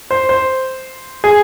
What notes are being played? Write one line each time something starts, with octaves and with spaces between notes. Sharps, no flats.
C5
C5
G#4